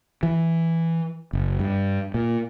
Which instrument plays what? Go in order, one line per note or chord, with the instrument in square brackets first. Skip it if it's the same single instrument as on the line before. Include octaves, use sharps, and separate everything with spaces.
[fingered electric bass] E3
F#1
G2
A#2